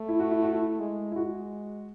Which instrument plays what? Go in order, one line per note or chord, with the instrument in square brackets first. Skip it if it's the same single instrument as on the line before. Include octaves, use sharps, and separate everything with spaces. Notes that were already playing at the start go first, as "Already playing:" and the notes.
Already playing: [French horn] A3
[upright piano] E4
F#4
E4
F#4
E4
[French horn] G#3
[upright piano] E4
[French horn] G#3 [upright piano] F#4